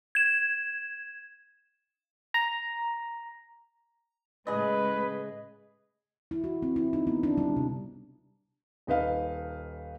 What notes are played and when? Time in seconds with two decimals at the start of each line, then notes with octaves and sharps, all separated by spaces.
0.15 G#6 E7
2.34 A#5
4.47 A2 C#3 G#3 G#4 B4 D#5
6.31 E4
6.44 F#4
6.62 C4
6.76 E4
6.93 D#4
7.07 B3
7.23 D4
7.37 G3
7.57 C3
8.87 D#1 D#4 B4 F5